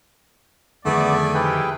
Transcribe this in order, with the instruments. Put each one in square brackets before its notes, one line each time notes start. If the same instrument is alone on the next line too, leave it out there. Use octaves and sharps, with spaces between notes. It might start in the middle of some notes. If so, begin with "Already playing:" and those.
[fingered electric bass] F2 D3 D#3 [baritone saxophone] A3 [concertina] B3 [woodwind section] G#4 D5
[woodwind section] G#2 C3 E4 [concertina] G#4 B4 G5